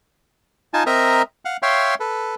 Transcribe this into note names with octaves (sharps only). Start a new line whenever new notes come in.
D#4 F4 G#5 A5
C4 A#4 D#5 E5 A#5
F5 F#5
C#5 E5 F5 G5 C6
A4 B4